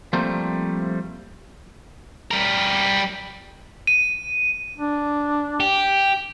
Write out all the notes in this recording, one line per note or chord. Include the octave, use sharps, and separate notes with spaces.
F3 G3 A3 A#3 C4
G3 A#4
D#7
D4
G4